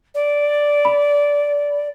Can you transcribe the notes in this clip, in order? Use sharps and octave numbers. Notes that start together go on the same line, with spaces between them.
D5
B5